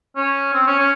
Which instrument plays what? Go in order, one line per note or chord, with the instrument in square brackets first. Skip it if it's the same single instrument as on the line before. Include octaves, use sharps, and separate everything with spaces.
[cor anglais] C#4
C4
C#4
C#4